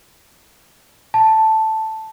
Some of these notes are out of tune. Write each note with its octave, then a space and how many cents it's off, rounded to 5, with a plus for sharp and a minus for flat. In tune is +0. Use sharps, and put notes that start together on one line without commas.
A5 +0